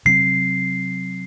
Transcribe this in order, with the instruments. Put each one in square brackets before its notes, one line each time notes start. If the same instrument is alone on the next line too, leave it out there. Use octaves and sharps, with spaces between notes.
[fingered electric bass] C3 F#3 C4 [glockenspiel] C7